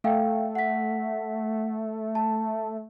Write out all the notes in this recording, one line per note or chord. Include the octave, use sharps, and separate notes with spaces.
A3 A4 F5 G5
F#5 B6
A5